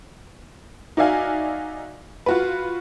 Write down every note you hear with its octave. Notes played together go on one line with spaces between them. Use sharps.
D#4 F#4 D5 E5 F5 G#5
F4 F#4 B4